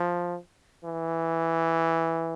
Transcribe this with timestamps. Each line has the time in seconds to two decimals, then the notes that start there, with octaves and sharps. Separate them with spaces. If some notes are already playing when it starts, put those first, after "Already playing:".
Already playing: F3
0.84 E3